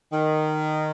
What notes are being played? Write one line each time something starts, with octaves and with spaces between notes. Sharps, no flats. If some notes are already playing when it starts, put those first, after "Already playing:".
D#3